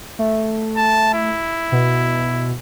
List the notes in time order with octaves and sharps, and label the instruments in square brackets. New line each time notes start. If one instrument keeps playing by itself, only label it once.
[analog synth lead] A3
[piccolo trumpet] A5
E4
[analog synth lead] B2